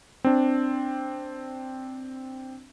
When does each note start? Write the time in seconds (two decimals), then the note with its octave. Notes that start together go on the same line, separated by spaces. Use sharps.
0.24 C4 D4